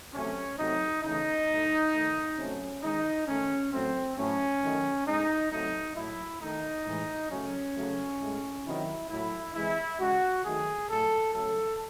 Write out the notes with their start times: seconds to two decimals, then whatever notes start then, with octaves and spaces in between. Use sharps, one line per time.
0.13 C3 F#3 A3 C#4
0.58 C3 F#3 A3 D#4
1.03 C#3 E3 A3 D#4
1.48 A2 F#3 A3
1.93 D#3 A3
2.37 C3 F#3 A3 C#4
2.82 D#3 G#3 D#4
3.27 D#3 A3 C#4
3.72 A2 F#3 A3 C4
4.16 A2 F#3 A3 C#4
4.62 D#3 F#3 A3
5.06 A2 G#3 D#4
5.51 C3 F#3 A3 D#4
5.95 A2 F#3 A3 E4
6.40 D#3 A3 D#4
6.86 A2 E3 G#3
7.30 C#3 F#3 A3 C#4
7.75 C#3 F#3 A3
8.20 A2 G#3
8.65 C3 D#3 F#3 E4
9.09 A2 F#3 A3 E4
9.54 C3 E3 G#3 E4
9.99 C#3 G#3 F#4
10.44 D#3 F#3 A3 G#4
10.89 A2 F#3 A3 A4
11.33 C#3 F#3 A3 A4